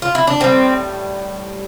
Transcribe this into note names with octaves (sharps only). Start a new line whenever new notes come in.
F4
E4
D4
A2 E3 G3 C4